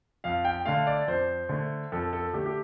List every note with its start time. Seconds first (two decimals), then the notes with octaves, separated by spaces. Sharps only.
0.24 F2 F5
0.44 G5
0.65 D3 A3 F5
0.86 D5
1.07 F2 C5
1.49 D3 A3
1.92 F2 A4
2.13 A4
2.33 D3 A3 G4
2.46 G4